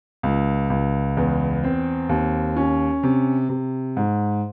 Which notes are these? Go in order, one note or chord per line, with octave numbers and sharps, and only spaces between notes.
C#2
C#2
E2
C4
D#2
C#4
C3
C3
G#2